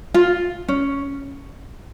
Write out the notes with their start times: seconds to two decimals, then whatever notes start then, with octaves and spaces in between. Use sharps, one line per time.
0.14 F4
0.68 C#4